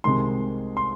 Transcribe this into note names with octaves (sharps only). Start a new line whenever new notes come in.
C2 C3 D#3 G#3 C6
C6